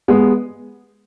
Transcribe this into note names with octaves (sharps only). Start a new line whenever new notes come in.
G#3 B3